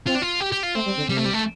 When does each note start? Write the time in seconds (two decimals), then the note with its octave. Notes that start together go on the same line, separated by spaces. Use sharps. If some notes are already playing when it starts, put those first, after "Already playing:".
0.06 C4 F4
0.15 D4
0.22 F4
0.40 G4
0.52 G4
0.63 F4
0.75 A3 C4
0.86 G3
0.97 D3
1.09 C3 G3
1.17 A3
1.25 G3
1.34 A3